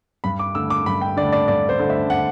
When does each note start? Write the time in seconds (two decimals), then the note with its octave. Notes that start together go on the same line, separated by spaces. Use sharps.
0.24 G2 B5
0.39 D6
0.55 D3 A3 E6
0.70 D6
0.86 G2 B5
1.01 G5
1.17 D3 D5
1.22 A3
1.32 D5
1.48 G2 D5
1.69 C5
1.79 D3 A3
1.90 E5
2.10 F#5